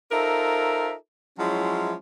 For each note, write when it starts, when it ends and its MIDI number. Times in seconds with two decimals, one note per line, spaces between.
0.12 0.93 63
0.12 0.93 65
0.12 0.93 69
0.12 0.93 70
0.12 0.93 72
0.12 0.93 76
1.39 1.94 53
1.39 1.94 54
1.39 1.94 56
1.39 1.94 61
1.39 1.94 64